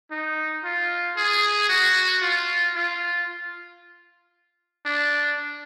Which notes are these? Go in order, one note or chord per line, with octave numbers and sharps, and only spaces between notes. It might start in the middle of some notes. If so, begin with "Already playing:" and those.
D#4
F4
G#4
F#4
F4
F4
D4